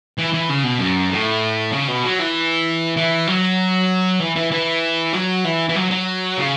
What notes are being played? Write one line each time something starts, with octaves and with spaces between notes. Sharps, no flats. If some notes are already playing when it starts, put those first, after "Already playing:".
E3
E3
C#3
B2
F#2
A2
C#3
B2
F#3
E3
E3
F#3
E3
E3
E3
F#3
E3
E3
F#3
F#3
C#3